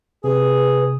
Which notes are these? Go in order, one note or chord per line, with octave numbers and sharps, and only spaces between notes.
C3 G#4 B4